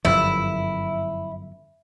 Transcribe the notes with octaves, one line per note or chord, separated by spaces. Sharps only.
G1 F#2 F3 E4